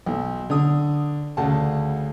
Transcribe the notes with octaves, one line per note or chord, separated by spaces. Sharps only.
B1
D3 D#6
D2 C#3 F#5 A5